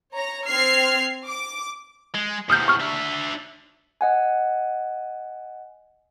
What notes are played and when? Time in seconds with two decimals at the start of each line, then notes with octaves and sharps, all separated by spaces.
0.15 C#5 A#5
0.48 C4 F6 G#6 C7
1.27 D6
2.15 G#3
2.50 E2 C3 D#6 F6 G6
2.68 C#6 F6
2.81 D4 E5
4.01 D#5 F#5 G#5